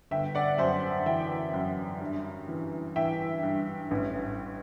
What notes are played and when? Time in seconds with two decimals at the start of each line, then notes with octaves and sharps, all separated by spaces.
0.11 G1 E5 G5
0.35 D5 F#5
0.58 F#2 C5 E5
1.06 E3 E5 G5
1.54 F#2
2.00 G2
2.48 E3
2.96 E3 E5 G5
3.43 G2
3.91 A1